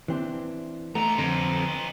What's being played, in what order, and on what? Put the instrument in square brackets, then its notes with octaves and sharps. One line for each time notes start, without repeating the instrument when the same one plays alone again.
[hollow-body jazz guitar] E3 C4 D4
[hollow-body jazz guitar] A3 [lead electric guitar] B3 D#4 [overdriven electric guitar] A#5
[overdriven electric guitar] F2 [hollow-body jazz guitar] D3